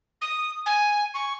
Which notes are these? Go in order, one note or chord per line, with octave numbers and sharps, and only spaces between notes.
D#6
G#5
C#6